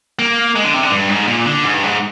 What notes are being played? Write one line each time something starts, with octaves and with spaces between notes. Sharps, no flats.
A#3
G#3
D3
C3
D3
G2
G#2
A#2
D3
G#2
G2
G#2